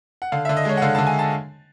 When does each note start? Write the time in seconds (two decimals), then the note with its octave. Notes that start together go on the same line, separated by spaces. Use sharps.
0.22 F#5
0.32 D3 F5
0.45 E5
0.49 D3
0.57 D#5
0.65 G#3 C#5
0.77 F#5
0.82 D3 F5
0.95 A5
0.98 D3
1.07 G#5
1.19 A5